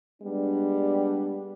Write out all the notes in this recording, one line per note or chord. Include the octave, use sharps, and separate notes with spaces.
G3 G#3 B3 D4